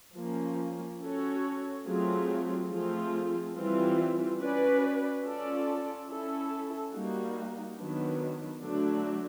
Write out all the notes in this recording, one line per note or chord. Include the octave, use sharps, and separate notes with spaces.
F3 A#3 C#4
C#4 F#4 A4 C#5
F#3 A3 C4 F4 G#4
F3 A3 C4 F4 G#4
E3 G3 C4 F4
C#4 F#4 B4 D5
C#4 F4 A4 D5
C#4 E4 A4
G3 A#3 D#4 F#4
D#3 F#3 B3 D4
D3 F#3 A3 D4 F#4